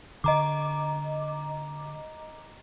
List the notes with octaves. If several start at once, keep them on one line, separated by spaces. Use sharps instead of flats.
D3 D#5 A#5 D6